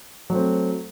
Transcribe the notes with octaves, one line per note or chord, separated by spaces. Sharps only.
F#3 A3 C4